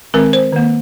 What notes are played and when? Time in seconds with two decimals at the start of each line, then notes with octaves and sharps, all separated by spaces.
0.14 D#3 G#3 C4 A#4
0.33 C5
0.53 D#3 A#3